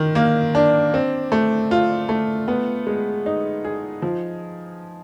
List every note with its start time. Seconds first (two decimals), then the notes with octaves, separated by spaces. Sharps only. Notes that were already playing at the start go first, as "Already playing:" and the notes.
Already playing: D#3
0.15 A#3
0.55 D4
0.94 C4
1.32 A3
1.71 F4
2.09 A3
2.48 B3
2.87 G#3
3.26 D#4
3.65 G#4
4.02 F3